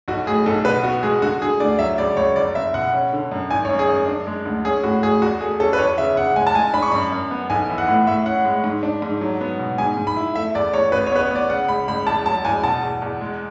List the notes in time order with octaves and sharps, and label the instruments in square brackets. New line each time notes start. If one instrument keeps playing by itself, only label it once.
[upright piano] B1 F#4
A2 G#4
B1 A4
B2 B4
B3 F#4
G#3 G#4
D3 F#4
D3 G#4
D2 D5
F#3 E5
C#2 D5
C#2 C#5
F#1 D5
F#1 E5
B2 F#5
C#4
D3
F#2
G#1 G#5
C#5
F#2
G#4
F#2
D4
G#3
D2
C#4 G#4
A2 F#4
A2 G#4
E2 F#4
A3 G#4
C#4 A4
B4
E2 C#5
C#3 E5
C#3 F#5
G#3 G#5
A5
G#3 G#5
D4 B5
C#6
F#2 B5
F#2
B3
B1 G#5
E3
F#5
A2
A2 E5
C#4 F#5
G#3
G#2
D4
G#2
F#3
B3
B2
G#2 G#5
G#2
B5
E4
A3 E5
E2 D5
E2 C#5
A1 B4
C#5
B3 B4
C#5
B3 D5
C#3 F#5
C#2 B5
C#2 B5
E2 A5
F#3 A5
E2 G#5
B2 A5
E2
E2
G#3